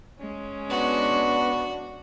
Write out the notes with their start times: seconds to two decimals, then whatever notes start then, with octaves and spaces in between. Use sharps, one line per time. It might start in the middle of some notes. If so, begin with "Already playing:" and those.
0.19 G#3 C#4
0.70 B3 D4 F#4